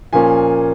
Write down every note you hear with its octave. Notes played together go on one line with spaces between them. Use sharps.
A#2 F3 A#3 C#4 G#5